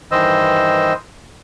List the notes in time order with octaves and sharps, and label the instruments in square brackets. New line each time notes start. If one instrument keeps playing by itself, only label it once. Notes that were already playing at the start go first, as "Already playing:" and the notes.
[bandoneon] G2 D#3 E3 C5 D#5 E6